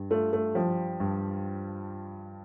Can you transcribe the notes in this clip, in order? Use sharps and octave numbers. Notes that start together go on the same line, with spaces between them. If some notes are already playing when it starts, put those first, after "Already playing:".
Already playing: G2
A3 F4
A3
F3 G3
G2